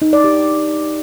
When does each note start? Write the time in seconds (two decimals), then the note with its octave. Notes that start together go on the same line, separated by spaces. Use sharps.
0.02 D#4
0.13 D5
0.24 G4